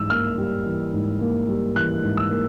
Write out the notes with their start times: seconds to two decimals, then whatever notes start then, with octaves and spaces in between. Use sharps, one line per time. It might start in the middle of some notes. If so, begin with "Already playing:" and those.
Already playing: G#2 E3 G3 E6
0.10 A#3 F6
0.38 G3
0.66 E3
0.94 G#2
1.21 A#3
1.49 G3
1.76 E3 F#6
2.03 G#2
2.17 E6
2.31 A#3